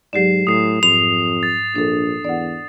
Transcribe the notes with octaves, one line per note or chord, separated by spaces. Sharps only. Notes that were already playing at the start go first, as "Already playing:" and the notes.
G#2 F#3 G4 D5 C7 E7
A2 D#6 C7
F2 G#2 F7
A6
A#1 D4 A4
E2 D5 F#5